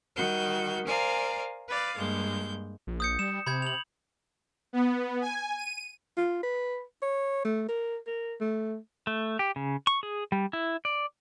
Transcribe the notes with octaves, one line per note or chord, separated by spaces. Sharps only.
D#3 G3 F#4 G6
A#4 C5 D5 F5 G#5 A#5
B4 D5 F5
G2 G#3 A#3 G6
A#1
D#6 G6 C#7
G3 E7
C3 B5 G6 G#6
F7 F#7
B3
G#5
D#7
F4
B4
C#5
A3
A#4
A#4
A3
A3
G4
C#3
C#6
G#4
G3
E4
D5